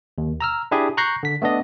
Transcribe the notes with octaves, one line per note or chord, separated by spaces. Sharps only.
D#2
A#5 E6 F6
D4 E4 G4 G#4 G#5
A#5 C#6 F#6 G6 A#6 C7
D3 B6
A3 B3 D4 D#5